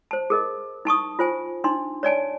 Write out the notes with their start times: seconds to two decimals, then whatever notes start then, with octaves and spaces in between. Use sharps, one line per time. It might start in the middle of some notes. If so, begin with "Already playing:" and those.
0.11 C5 A5
0.30 G#4 A#4 D#5
0.85 D#4 A5 C#6 D#6
1.19 F4 C5 G#5
1.64 D4 D#4 C6
2.03 C#5 D5 G#5 A5